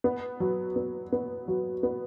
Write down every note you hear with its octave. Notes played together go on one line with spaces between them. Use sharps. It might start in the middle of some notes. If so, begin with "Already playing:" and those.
B3
F#3
B3
B3
F#3
B3